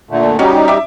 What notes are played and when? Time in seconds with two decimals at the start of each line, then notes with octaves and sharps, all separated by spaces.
0.10 A#2 D3 A3
0.39 G3 C#4 D#4 F#4 G4
0.68 E5 D6